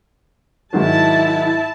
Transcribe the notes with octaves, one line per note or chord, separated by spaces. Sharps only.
G#2 D#3 F#3 E4 A5